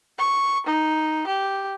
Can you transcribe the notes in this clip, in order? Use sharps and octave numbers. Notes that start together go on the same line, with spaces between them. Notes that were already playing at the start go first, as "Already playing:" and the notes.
C#6
D#4
G4